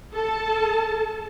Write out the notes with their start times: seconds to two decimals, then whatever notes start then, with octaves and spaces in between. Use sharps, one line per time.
0.14 A4 A5